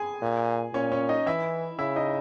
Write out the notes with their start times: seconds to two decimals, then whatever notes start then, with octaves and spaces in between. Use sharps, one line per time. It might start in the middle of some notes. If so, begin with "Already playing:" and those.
Already playing: G#4 G#5
0.22 A#2
0.74 A#2 C#4 C#5
0.92 C#4 C#5
1.09 D#4 D#5
1.26 E3 E4 E5
1.79 C#3 E4 E5
1.96 D#4 D#5